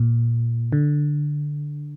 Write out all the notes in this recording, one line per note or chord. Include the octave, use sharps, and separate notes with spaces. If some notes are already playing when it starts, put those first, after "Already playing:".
Already playing: A#2
D3